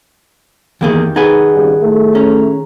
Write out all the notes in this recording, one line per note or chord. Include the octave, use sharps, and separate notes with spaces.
E2 D#3 A#3 G4 G#4
D#4 G#4 B4 F#5
G#1 C#3 G3
A2 A3
C#4 A#5